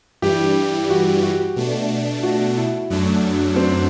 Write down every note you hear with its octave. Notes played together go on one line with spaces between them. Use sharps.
G2 E3 G3 G4
F#4
F#4
B2 A3 D4
F#4
E4
F#2 F#3 A3 D4
C4